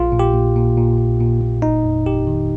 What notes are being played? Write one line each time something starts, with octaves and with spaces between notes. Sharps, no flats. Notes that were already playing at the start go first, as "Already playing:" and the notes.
Already playing: A#1 F4
A#2
G4
A#2
A#2
A#2
A#2
A#2
A#2
G1 D#4
F2
G1 G4
D#3